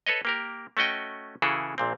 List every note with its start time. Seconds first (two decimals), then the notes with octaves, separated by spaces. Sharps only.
0.07 A4 B4 C#5 D#5
0.25 A#3 G4 A#4
0.77 A3 C#4 F#4 D#5 G5
1.42 C#3 E3 E4 F#4 G#4 A4
1.78 A#1 A#2 C4